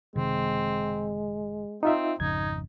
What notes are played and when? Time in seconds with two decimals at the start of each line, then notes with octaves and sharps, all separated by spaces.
0.16 F#1 C3 D#3 G#3 C4
1.83 C4 D#4 F4 E5
2.20 G#1 F2 C#3 D#4 G#6